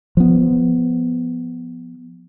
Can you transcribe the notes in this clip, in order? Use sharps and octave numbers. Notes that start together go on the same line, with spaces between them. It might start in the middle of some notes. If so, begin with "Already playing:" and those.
F3 B3